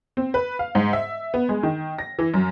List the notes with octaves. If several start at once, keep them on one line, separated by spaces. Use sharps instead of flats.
C4
B4
F5
G#2
E5
B3
G#3
D#3
A#6
E3
F#2